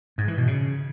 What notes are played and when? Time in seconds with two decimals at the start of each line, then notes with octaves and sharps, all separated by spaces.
0.18 G#2
0.28 E3
0.37 B2
0.47 C#3